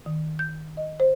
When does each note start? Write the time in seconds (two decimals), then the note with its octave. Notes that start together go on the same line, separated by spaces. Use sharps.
0.06 D#3
0.39 G6
0.77 D#5
1.00 C5